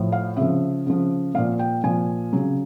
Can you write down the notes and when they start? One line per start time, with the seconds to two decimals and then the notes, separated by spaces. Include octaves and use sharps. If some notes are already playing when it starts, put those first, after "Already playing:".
Already playing: A2 F3
0.12 F5
0.37 C#3 F3 E5
0.86 C#3 F3
1.35 A#2 F3 F5
1.59 G5
1.84 A#2 F3 G#5
2.33 C#3 F#3